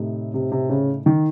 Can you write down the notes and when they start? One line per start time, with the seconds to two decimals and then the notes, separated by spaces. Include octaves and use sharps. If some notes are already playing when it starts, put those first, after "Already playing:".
Already playing: A2 C3 A3 D#4
0.34 C3
0.52 C3
0.69 C#3
1.06 D#3